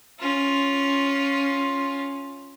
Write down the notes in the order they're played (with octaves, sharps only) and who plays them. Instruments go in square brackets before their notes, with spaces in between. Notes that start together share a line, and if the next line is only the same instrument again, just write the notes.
[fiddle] C#4 F4